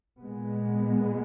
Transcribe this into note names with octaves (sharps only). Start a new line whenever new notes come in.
A#2 G#3 B3